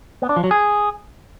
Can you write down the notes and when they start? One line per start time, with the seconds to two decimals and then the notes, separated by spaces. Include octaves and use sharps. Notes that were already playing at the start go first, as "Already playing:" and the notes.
0.22 B3
0.29 D4
0.36 F3
0.44 F#3
0.51 G#4